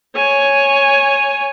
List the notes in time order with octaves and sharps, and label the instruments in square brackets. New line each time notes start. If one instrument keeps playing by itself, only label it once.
[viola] C#5 G#5